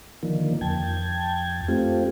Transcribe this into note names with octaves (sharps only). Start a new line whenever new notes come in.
D3 D#3 F3 A#3
F2 G5 A5 G#6
A3 C4 F4 G4